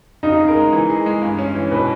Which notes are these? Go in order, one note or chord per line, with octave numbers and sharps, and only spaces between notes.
C#3 D#4
G#4
A#4
G#3
E3
G#4
G#3
G2
C#4
E3
B2 B4